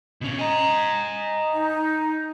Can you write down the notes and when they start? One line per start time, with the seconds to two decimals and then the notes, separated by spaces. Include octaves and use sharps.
0.21 B2 C#4
0.39 D#5 G#5 A#5
1.53 D#4